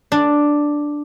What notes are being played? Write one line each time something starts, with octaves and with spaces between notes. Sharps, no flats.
D4